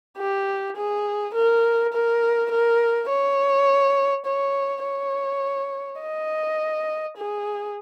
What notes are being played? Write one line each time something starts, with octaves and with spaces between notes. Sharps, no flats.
G4
G#4
A#4
A#4
A#4
C#5
C#5
C#5
D#5
G#4